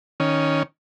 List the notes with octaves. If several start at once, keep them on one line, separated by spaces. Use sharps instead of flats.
D#3 C#4